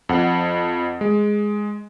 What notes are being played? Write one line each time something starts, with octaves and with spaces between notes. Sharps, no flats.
F2 F#5
G#3